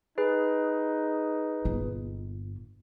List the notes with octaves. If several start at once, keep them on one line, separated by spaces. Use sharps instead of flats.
D#4 G#4 B4
G1 A#2